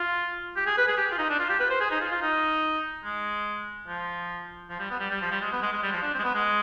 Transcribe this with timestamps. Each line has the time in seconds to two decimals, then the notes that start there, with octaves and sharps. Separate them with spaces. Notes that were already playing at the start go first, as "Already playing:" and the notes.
Already playing: F4
0.56 G4
0.66 G#4
0.77 B4
0.88 G#4
0.97 G4
1.12 F4
1.18 D#4
1.29 D4
1.39 F4
1.49 G4
1.59 B4
1.70 C5
1.80 G#4
1.90 D#4
2.01 F4
2.12 F4
2.21 D#4
3.04 G#3
3.87 F3
4.69 F3
4.79 G3
4.90 B3
5.00 G3
5.10 G3
5.21 F3
5.31 G3
5.41 G#3
5.52 B3
5.62 G#3
5.73 G#3
5.83 G3
5.93 F3
6.02 D4
6.13 C4
6.19 G#3
6.23 B3
6.34 G#3